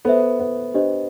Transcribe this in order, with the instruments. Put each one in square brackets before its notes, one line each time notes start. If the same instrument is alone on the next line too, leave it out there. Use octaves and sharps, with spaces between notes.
[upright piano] B3 [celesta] A4 C5 E5
[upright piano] B3
[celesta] D4 G4 C5 D#5